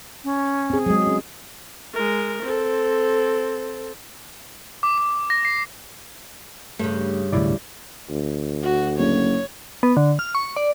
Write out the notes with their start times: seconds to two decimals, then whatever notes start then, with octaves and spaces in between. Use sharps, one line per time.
0.24 C#4
0.70 C4 G#4
0.86 F#3 G#3 G#4
1.07 C#4
1.94 G#3 A#4
2.43 C4 A4
4.83 D6
4.98 D6
5.30 A#6
5.45 C7
6.79 G2 C#3 A3
7.33 D2 A2 C3 E4 D5
8.10 D2
8.63 F#4
8.99 F#1 C#5
9.83 B3
9.97 D3
10.19 F6
10.35 C#6
10.57 D5